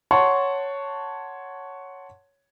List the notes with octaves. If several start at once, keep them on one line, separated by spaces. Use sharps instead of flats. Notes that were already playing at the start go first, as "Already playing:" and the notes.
C#5 F#5 A5 C6 C#6